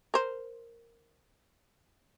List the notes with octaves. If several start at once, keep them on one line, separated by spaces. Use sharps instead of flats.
A#4 C5